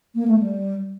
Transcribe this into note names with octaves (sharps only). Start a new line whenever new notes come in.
A#3
A3
G3